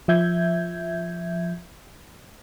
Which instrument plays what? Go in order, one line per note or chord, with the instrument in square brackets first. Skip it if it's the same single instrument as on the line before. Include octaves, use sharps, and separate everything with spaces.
[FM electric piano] F3 E5 G6 G#6